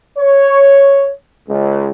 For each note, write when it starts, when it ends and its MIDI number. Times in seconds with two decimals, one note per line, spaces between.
0.19 1.10 73
1.49 1.90 37